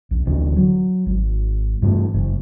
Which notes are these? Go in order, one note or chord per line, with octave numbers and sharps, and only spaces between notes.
A#1
D1 D3 E3
F#3
G#1
G2 E3 F#3 A3
F#1